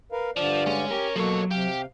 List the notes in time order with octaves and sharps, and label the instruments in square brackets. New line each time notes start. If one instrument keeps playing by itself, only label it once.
[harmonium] A#4 B4 F5
[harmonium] G2 D3 D5 [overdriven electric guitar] F3
[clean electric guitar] G#3 G#4 [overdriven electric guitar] C#4
[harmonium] G4 [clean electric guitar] A#4
[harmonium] B2 A#3 A4 [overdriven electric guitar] F3 C#5 [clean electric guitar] F#3
[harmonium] C3 F5 [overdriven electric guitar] G4